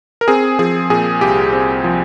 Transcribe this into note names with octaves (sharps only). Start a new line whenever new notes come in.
A#4
C4 G#4
F3 G#4
A#2 G#4
C2 G4
C4
F3